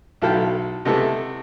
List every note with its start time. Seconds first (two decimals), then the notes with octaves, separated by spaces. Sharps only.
0.22 B1 B2 E4 A4 F5 G5
0.85 C3 G#3 A3 B3 E4 A4